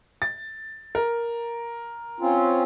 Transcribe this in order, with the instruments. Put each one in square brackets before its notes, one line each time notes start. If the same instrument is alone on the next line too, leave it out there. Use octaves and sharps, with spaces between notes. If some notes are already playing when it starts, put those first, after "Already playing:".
[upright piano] A6
A#4
[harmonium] C4 C#4 F4